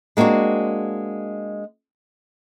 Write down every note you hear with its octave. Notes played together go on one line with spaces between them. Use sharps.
G#3 A#3 C4 D4 F#4